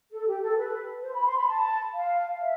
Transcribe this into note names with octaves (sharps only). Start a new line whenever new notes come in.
A4
G4
A4
B4
C5
B5
C6
B5
A5
F5
E5